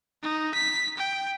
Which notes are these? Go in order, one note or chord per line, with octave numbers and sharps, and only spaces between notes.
D#4
B6
G5